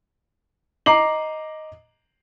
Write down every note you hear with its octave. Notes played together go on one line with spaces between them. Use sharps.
D#5 A#5 D6 C7 F#7